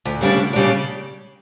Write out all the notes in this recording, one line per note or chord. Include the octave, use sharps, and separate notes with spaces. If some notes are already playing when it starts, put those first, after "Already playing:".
D2
C#3 G3 A#3 D4
D2
C#3 G3 A#3 D4